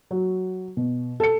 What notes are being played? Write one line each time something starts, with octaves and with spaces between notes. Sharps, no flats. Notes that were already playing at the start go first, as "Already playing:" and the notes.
F#3
B2
A4 C#7